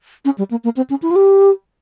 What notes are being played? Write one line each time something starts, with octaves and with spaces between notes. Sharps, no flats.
C#4
G3
A#3
A#3
C4
C#4
E4
F4
G4